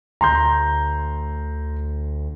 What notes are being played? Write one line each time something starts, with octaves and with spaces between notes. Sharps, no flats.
D2 A#5 C6 G6